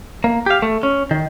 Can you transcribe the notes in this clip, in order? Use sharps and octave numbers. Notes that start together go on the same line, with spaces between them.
A#3
G4 F5
A3
C#4
D#3